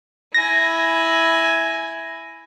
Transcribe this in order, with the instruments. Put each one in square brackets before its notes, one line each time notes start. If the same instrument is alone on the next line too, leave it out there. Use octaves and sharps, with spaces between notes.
[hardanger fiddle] E4 G#5 [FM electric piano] A#6